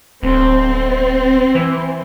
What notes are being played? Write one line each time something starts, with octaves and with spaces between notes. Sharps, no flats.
D1 C4
E3